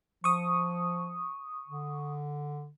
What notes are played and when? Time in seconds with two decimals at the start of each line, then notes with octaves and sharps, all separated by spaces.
0.24 F3 C#6 D#6
1.68 D3